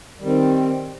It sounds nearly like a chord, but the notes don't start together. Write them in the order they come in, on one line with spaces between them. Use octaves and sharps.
G3 D#3 C4